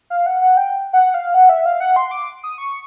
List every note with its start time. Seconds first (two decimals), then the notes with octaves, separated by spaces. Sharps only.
0.10 F5
0.26 F#5
0.41 F#5
0.57 G5
0.93 F#5
1.14 F5
1.34 F#5
1.49 E5
1.66 F5
1.80 F#5
1.96 C6
2.11 D6
2.43 D#6
2.58 C#6